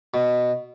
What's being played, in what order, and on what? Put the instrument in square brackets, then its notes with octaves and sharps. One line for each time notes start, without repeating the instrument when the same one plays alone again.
[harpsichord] B2